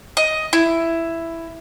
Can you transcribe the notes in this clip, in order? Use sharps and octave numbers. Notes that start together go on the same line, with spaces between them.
D#5
E4